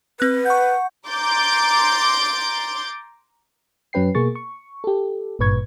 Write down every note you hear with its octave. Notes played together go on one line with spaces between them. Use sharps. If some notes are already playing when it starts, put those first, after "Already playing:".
C4 B4 F#6
F#5 C#6 G6
A#5 C6 D6 G6 A6
F#2 F#3 C#4 B4 G5 C7
B2 A#3 G#4 C#6 A6
C#6
G4 A4
G#1 G2 A#2 B4 C#6 G#6